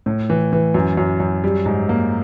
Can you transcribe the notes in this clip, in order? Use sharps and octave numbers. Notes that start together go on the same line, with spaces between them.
A2
E3
E3
F#2
F#2
F#2
G3
G#2
A#3